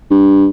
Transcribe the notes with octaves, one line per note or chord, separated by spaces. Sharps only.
G2